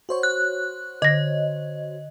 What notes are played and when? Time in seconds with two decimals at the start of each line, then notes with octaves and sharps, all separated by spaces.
0.09 F#4 C5 C#5
0.23 F#6
1.02 D3 D#5 A#6